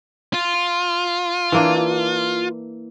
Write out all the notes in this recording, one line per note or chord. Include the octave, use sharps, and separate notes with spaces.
F4
E3 A#3 D4